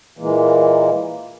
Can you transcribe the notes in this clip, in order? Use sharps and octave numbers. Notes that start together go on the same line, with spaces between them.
A#2 E3 G#3 A#3